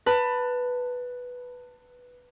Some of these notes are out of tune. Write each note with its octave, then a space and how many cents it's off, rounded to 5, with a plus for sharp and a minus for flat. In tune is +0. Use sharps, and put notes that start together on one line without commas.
B4 +0 A5 +25